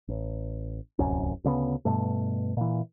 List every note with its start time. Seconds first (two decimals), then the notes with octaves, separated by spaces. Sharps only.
0.08 A1
0.99 D1 C2 F#2 C#4
1.44 D2 C#3 A#3 B3
1.85 G2 B2 A3
2.57 A#2 E3